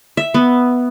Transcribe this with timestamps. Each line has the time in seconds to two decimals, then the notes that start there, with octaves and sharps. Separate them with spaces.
0.17 E5
0.34 B3